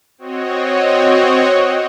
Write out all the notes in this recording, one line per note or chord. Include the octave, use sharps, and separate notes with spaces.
C4 F#4 C#5 D#5